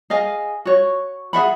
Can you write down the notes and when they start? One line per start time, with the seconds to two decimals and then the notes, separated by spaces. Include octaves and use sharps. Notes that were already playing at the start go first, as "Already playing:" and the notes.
0.10 G#4 D#5 F5 G#5
0.65 F#4 C#5
1.33 G#4 E5 F#5 B5